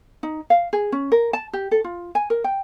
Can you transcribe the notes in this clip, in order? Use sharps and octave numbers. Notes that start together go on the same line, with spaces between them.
D#4
F5
G#4
C#4
A#4
A5
G4
A4
F4
G#5
A#4
G5